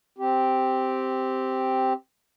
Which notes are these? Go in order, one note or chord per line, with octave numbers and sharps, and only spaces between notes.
C4 G4